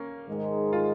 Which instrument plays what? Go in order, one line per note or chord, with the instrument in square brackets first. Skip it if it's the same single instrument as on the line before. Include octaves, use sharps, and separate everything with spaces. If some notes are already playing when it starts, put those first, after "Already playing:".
Already playing: [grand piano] A#3 C#4
[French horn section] G#2 D#3 G#3
[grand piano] F4